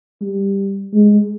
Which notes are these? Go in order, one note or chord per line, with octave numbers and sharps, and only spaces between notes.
G3
G#3